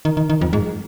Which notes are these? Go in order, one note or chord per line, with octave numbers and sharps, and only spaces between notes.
D#3
D#3
D#3
F2
G#2